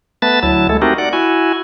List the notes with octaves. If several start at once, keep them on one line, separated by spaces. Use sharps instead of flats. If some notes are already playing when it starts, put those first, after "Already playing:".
A3 B3 B4 A5 A6
D2 F#3 E4 A5
G#3 A3 A4
A3 C4 D#4 F#4 G4 A#4
D5 F#5
E4 F#4 G#5